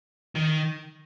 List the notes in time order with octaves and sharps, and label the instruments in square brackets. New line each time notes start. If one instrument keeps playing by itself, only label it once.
[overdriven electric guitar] D#3